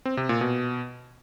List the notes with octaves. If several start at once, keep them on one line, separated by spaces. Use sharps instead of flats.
C4
C3
A#2
B2